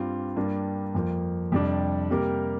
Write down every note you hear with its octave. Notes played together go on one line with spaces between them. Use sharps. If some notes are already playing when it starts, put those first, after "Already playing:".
Already playing: G2 G3 C4 F4
G2 G3 A#3 D4
F2 F3 A#3
F2 C3 G3 D4
C3 G3 A#3 G4 A#4